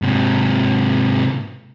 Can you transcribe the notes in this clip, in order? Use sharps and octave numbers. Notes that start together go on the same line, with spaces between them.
G#2 C3